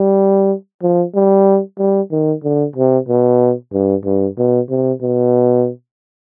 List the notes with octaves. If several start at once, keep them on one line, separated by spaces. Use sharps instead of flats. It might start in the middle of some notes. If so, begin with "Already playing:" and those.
Already playing: G3
F3
G3
G3
D#3
D3
C3
B2
G2
G2
B2
C3
B2